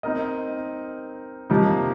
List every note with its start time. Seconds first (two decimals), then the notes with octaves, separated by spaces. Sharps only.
0.03 C4 D#4 A#4 D#5
1.50 C3 F3 A#3 D#4 G4